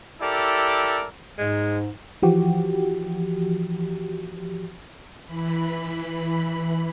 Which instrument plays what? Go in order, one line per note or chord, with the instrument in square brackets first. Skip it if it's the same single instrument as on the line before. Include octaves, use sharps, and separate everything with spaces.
[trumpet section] E4 G4 A4 A#4 D5
[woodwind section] G#2 [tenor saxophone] G#3
[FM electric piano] E3 F3 F#4 G4
[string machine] E3 B5